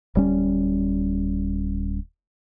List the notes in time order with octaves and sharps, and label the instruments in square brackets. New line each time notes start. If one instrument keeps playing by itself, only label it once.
[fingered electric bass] D1 G3 C#4